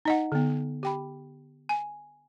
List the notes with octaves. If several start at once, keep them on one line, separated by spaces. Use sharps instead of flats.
D#4 D#5 F#5
D3 B3
G4 G5 B5
G#5